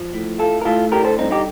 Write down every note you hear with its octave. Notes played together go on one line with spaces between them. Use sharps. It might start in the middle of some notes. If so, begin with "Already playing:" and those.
Already playing: F3
A2
A3 F4 A4
A#4
A2 F4 A4
D3 G4 A#4
A4 C5
G2 C4 D#4
D#4 G4